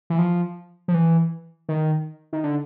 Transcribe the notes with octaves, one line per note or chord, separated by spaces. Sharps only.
E3
F3
F3
E3
D#3
D#3
D3